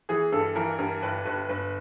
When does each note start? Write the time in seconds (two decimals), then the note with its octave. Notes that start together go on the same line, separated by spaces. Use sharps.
0.09 E3 G#4
0.32 G2 A4
0.56 E3 A#4
0.79 G2 A#4
1.03 G1 B4
1.25 G1 B4
1.49 G1 B4